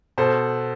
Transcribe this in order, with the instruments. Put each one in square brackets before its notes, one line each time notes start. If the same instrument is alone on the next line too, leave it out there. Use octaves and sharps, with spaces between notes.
[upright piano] B2 A4 C5